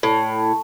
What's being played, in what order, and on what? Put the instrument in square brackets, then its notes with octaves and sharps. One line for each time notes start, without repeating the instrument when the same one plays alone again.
[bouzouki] A2